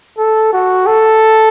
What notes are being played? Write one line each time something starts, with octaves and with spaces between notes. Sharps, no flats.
A4
F#4
A4